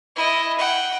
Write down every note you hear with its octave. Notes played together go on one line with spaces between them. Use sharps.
E4 D#5
F#5 G5